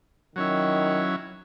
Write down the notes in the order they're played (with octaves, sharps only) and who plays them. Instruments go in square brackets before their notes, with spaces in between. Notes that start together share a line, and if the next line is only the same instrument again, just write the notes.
[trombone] D#3 [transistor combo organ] F#3 C#4 E4